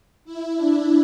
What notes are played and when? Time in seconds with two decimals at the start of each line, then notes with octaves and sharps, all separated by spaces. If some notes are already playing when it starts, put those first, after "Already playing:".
0.25 E4
0.56 D4